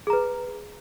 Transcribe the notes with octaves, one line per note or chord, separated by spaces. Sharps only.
G#4 B4 A#5